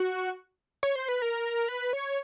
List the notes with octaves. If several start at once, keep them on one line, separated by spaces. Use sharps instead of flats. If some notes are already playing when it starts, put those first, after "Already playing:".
Already playing: F#4
C#5
C5
B4
A#4
B4
C#5